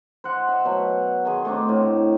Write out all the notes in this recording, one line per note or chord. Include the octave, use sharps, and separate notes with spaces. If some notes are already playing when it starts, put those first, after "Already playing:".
C5 D#5 F#5
E5
B2 F#3
D#3 G#4 C6
A3 C4 D4 D#4
A2 C4